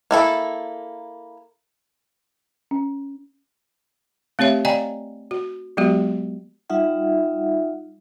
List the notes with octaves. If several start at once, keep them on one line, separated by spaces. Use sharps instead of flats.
A#3 E4 A4
C#4
A3 C4 G4 C#5 E5
D5 D#5 F5 G5 G#5 A#5
F#4
F#3 G#3 B3 F#4 G4
G3 D#4 F4 E5 F#5